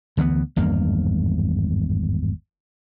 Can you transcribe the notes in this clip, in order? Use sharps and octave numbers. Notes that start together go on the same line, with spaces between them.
D2 E3 G#3 B3
G#1 E2 G2 A#3